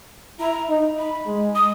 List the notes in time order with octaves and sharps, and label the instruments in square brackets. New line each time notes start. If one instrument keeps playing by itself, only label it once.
[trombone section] E4 [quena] A#5
[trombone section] D#4
[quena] B5
[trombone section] G#3
[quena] D#6